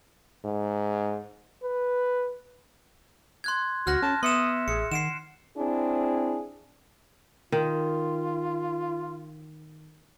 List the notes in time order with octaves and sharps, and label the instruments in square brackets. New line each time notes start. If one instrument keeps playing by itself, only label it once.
[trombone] G#2
B4
[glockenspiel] C6 F#6 G#6
[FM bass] D2 [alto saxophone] F#4 [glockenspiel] F6 F#6 A#6
[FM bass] C#4 [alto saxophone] A5
[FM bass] B3 [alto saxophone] E5 [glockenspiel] C6 C#7 E7 [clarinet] D#6
[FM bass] A1 [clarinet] G#4 [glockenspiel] C#7
[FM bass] D#3 [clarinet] F#5 [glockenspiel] C7 D7 E7
[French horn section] C4 D4 E4 G#4
[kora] D#3 [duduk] F4